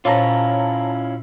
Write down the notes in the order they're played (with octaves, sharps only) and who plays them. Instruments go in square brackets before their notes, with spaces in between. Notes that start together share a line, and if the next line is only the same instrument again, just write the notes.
[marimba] A#2 C5 [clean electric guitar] C#4 E4 F4 [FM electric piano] C#5 A5 A#5